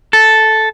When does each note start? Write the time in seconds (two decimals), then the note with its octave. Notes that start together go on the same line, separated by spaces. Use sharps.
0.13 A4